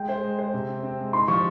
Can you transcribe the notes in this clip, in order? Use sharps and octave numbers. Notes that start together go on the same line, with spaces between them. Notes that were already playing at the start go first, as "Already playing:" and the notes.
Already playing: G#3 G5
C5
G#3
C5
C3
C4
C4
G#3
D#4 C6
F3 C#6